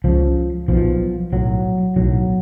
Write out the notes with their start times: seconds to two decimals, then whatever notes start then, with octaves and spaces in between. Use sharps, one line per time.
0.04 C#2 C#3 F3
0.68 B1 B2 F3
1.32 B1 A2 F#3
1.96 B1 A2 F#3